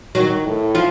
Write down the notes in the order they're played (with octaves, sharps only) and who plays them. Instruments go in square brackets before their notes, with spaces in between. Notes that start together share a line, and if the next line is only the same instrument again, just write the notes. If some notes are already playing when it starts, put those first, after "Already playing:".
[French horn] D#3 [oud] F#3 F#4
[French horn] A2
[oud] F3 F4